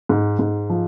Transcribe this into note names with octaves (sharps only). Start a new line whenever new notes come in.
G#2
G#2
F3